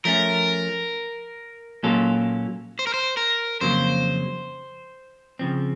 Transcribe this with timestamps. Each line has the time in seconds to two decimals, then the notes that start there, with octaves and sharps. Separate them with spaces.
0.05 F3 A3 C#4 A#4
1.83 A#2 F#3 A#3 C#4 A4
2.79 C5
2.87 A#4
2.94 C5
3.17 A#4
3.61 F2 C#3 F#3 A#3 C5
5.39 C#3 F3 C4